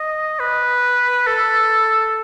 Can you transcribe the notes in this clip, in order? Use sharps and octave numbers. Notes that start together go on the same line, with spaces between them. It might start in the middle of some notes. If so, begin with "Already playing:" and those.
Already playing: D#5
B4
A4